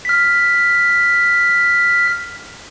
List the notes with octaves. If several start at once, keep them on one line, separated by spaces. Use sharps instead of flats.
F6 B6